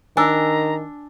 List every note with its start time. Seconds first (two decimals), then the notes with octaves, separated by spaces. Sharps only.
0.17 D#3 D4 G#5 A#5 E6